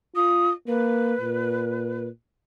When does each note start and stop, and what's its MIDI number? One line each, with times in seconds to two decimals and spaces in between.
0.16 0.53 65
0.16 0.51 87
0.67 1.15 58
0.67 2.06 71
1.21 2.09 46